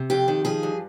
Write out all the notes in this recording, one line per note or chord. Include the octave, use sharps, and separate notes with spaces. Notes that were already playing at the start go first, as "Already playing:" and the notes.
Already playing: C3
F2 G4
D#3
F3 G#4
G2